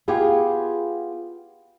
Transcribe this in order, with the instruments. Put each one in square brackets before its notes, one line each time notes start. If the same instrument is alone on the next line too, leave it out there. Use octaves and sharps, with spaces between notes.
[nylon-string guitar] B3 F4 G4 G#4